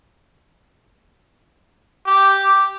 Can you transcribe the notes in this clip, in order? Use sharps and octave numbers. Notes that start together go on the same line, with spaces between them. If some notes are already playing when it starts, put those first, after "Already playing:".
G4